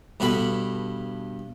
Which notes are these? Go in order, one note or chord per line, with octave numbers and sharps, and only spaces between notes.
G2 B2 D4 A4 B5